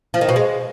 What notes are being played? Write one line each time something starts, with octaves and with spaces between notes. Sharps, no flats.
F3
D#3
B2
G#3